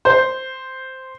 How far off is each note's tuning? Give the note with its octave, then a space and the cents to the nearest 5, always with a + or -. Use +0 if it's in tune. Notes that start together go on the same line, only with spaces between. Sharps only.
C5 -5